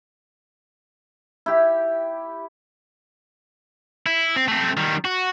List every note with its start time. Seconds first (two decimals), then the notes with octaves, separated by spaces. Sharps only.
1.46 E4 G4
4.06 E4
4.36 C4
4.48 A3 C4
4.77 D#3 G3
5.05 F#4